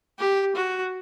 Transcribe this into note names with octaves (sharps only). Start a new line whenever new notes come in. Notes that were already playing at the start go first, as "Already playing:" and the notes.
G4
F#4